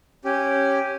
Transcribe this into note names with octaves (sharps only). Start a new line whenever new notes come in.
C#4 G4